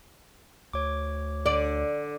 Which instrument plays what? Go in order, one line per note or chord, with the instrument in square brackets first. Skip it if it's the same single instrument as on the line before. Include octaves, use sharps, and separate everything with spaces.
[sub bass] D2 [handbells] C#5 D6
[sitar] D3 [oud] D5